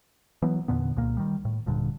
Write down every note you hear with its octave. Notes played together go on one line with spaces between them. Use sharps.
E3 F#3 B3
E2 A#2 D3 B3
C2 A#2 A#3
D#3 G3
A2
D#1 G2 A#2 D3